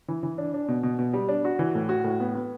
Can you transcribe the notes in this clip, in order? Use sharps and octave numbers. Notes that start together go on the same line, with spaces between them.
E3
E3
D4
D4
B2
B2
B2
G3
D4
F#4
E3
A2
F#4
A2
B3
B3